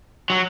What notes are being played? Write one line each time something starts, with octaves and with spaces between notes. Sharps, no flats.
F#3